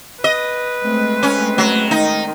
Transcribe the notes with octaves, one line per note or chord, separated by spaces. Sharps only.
B4 D#5
G#3 A3 C4
C#4
F#3
D#3 D#4